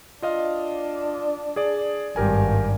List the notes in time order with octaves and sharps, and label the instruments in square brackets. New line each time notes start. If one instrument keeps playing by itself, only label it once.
[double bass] D4 [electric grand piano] F4 D#5 F5
[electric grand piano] G#4 D5
[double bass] G#1 G2 [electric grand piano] G4 A#4 G#5